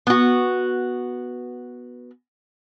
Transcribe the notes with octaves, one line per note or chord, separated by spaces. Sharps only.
B3 F#4